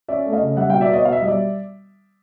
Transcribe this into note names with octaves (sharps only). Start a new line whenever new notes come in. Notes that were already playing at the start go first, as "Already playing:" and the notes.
C#4 D5 E5
A3
D#5 F5
C#3
G3 E5 F#5
B2 F5 G5
D5 E5
B3 C#5 D#5
B2 F5
E5
G3 D#5
D5 E5